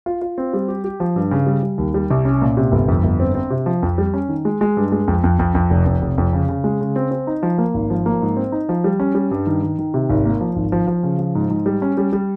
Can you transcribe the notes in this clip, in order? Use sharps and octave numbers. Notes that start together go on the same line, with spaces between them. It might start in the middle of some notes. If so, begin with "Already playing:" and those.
F4
F4
C4
G3
G4
G4
F3
G2
C#3
G3
G3
D#2
G3
C2
C#4
A#2
C3
G1
F2
G1
C4
C4
C3
F3
F2
G3
C#4
D#3
G#3
G#3
G2
G#3
F2
F2
F2
F2
F1
F2
F1
F2
C#3
C#3
G#3
C#3
C4
C4
D#4
F3
A#3
G#1
F3
A#3
G#2
C4
D#4
F3
G3
C#4
G3
G2
D#3
D#3
D#3
C3
G#1
A#3
F3
G#1
F3
F3
C#3
F3
G#2
G#2
G3
C#4
G3
G3